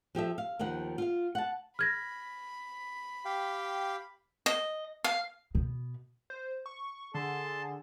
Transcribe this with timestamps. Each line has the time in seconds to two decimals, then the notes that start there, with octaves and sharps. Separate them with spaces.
0.15 F3 G4 A4 E5
0.38 F5
0.59 D#2 D#3 F3 F#5
0.98 F4 F5
1.35 F#5 A5
1.79 B5 F6 G#6 A#6
3.25 G4 F5 G5
4.46 D#5
5.04 F5
5.55 B2
6.30 C5
6.66 C#6
7.14 D3 G#4 A5 C6